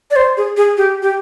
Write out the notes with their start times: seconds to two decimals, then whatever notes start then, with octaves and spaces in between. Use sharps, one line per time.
0.11 D5
0.16 C5
0.37 G#4
0.57 G#4
0.77 G4
1.02 G4